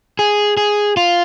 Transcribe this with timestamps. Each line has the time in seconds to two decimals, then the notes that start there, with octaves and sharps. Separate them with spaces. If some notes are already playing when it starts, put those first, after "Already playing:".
0.19 G#4
0.57 G#4
0.97 F4